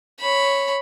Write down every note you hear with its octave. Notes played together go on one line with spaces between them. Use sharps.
C#5 B5